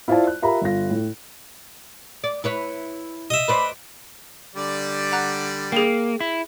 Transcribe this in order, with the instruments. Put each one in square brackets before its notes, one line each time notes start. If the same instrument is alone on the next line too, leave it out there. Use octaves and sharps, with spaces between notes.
[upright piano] E4 F4 C5 D5 E5 A5
F#6
F4 G4 A#4 E5 A#5 B5
G1 F4 A#6
A2
[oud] D5
E4 B4 C#5
[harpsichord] D#5 E5
[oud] B4 C5 D5 [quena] B5
[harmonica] D3 G3 D5
[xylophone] F#5 A#5 F#6
[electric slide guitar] A#3 [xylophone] G#4 G5
[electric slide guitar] E4